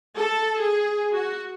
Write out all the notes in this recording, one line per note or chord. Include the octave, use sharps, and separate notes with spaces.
A4
G#4
F#4